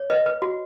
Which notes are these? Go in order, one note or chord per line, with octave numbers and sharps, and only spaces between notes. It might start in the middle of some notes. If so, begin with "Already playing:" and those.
Already playing: C#5
B4 D#5
B4
F#4